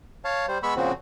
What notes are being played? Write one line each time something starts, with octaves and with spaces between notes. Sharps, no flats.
C#5 F5 A5
G3 C5
G#3 B3 B5 C#6 E6
A#2 C#3 F3 C4 F#4